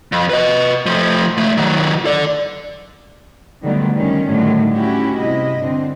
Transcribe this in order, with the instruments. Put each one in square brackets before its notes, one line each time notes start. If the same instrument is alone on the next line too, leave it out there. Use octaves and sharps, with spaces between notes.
[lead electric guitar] F2
B4 D#5
F3 A3
C#2 A3
D#3 F#3
A4 D5
[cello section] D3 D#3 F#3 G3 A3 B3
D#3 G3 C#4
A2 D3 D#3 F#3 G3
C#4 E4 F#4 G4
G2 C3 E4 D#5
D3 C4